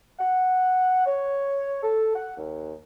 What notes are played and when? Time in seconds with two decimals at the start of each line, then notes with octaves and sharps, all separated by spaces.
0.19 F#5
1.06 C#5
1.83 A4
2.16 F#5
2.37 D#2